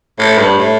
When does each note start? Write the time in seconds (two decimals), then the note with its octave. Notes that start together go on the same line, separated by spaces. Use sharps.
0.19 A2
0.38 G2
0.58 A2